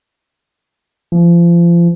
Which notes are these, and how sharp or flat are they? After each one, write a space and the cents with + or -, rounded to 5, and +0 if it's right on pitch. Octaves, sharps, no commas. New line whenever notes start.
F3 -35